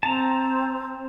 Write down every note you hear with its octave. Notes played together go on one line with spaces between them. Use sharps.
C4 A5 A#5